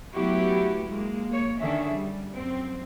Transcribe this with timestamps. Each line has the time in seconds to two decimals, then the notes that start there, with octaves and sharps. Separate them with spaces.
0.14 F#3 A3 B3 E4 F#4 G4
0.89 G#3 A#3
1.29 A#3 C#5
1.60 D3 D#3 C#4 D4 G#4 E5
1.93 G3
2.35 F#2 C4